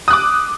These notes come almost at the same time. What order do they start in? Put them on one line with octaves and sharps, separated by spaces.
D#6 F#6 D6